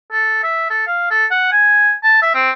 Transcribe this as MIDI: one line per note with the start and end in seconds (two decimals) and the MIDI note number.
0.12 0.41 69
0.43 0.68 76
0.70 0.83 69
0.87 1.07 77
1.10 1.26 69
1.31 1.49 78
1.52 1.93 80
2.04 2.19 81
2.22 2.34 76
2.35 2.51 60